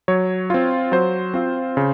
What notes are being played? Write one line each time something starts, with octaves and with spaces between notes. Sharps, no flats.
F#3 C#5
C4 F4
F#3 C5
C4 F4
C#3